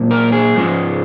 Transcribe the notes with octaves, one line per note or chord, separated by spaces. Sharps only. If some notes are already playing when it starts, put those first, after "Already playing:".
Already playing: A#2 F#3 A#3
A#4
G#4
G#2 F3 G#3 C#4